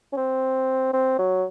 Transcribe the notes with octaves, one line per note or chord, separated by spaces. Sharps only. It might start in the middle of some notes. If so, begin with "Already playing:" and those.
C#4
C4
C4
F#3